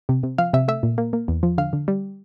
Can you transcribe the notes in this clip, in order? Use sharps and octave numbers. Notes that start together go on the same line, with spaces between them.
C3
C3
F3 F5
C3 E5
A3 E5
A#2
A#3
A#3
E2
F3
D3 F5
D3
G3